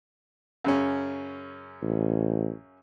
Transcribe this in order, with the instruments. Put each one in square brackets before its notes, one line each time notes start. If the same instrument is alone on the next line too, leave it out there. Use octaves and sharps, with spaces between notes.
[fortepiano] F#2 C#3 C#4
[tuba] A1